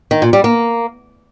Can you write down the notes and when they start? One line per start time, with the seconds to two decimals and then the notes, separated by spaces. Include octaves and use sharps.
0.11 D#3
0.22 A#2
0.33 G3
0.44 A#3